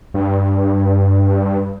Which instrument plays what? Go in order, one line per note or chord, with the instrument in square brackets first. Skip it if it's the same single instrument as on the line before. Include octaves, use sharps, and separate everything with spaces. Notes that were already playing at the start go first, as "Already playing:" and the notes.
[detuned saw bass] G2